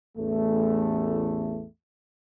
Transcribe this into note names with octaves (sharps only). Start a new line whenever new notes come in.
A1 E2 A3